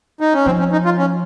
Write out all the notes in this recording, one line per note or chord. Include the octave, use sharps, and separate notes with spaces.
D#4
C#4
F3 C4
C#4
D#4
F4
C#4